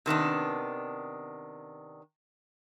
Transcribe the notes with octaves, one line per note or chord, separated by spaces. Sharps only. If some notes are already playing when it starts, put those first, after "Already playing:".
C3 D#3 B3 D4